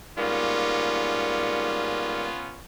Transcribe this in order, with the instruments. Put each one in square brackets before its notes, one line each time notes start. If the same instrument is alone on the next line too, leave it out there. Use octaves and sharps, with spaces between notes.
[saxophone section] G#2 G3 A#3 [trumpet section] B3 C#4 F4